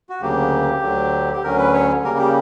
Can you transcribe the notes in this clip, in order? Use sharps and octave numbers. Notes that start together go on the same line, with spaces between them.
F#4
D2 C#3 F#3 A#3 G4
D2 D3 F#3
G4
D2 D3 F#3 C#4 A#4
B4
C#5
C#3 G3 A#3 A#4
G4